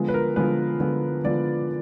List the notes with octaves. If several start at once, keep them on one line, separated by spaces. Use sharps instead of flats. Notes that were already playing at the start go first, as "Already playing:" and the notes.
Already playing: D3 F3 G#3 B3
B4
A#4
D3 F3 G#3 B3 B4
D3 F3 G#3 B3
D3 F3 G#3 B3 D5